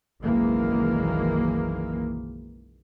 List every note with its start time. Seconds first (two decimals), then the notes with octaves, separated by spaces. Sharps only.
0.23 F#1 B1 D#3 E3 G#3 A#3